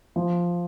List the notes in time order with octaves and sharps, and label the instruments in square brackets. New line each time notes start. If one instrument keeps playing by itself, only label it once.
[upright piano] F3